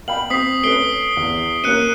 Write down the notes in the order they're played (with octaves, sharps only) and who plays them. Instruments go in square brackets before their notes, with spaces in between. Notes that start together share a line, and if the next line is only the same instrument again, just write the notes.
[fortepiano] F5 G5 B5 [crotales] F#7
[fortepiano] C4 [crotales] D#6 B6 C7
[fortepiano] A3 C#4 B4 [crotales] C7 D7 G7
[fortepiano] E2
[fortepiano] A#3 C#4 [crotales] F#6 C#7 D#7